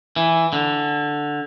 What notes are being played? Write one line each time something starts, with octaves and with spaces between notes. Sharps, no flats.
E3
D3